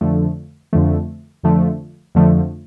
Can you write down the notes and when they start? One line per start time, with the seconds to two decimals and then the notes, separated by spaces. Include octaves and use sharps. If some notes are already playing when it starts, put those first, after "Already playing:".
0.01 F2 D3 F3 A3
0.73 F2 D3 F3 A3
1.43 F2 D3 F3 A3
2.15 F2 D3 F3 A3